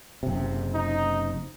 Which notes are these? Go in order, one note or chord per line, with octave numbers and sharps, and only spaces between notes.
F#1 C3
D#4